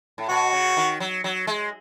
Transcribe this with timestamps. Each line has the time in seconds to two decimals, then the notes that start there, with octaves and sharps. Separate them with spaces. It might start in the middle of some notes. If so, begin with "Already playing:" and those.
0.18 A2
0.29 B2 F#4
0.53 C#3
0.77 D#3
1.00 F#3
1.24 F#3
1.47 G#3